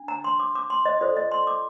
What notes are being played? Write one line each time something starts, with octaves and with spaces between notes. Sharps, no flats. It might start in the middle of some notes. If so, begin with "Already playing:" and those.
Already playing: D4
A#5
C6
D6
D6
C6
D#5
F4 A4 C5 D5
D#5
C6
D6